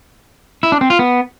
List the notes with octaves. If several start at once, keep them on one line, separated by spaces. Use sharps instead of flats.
E4
D4
C4
F4
B3